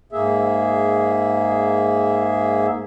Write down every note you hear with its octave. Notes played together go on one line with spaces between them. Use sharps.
G#2 A#3 G#4 E5